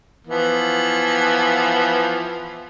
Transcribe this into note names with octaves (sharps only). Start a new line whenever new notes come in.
E3 F3 B3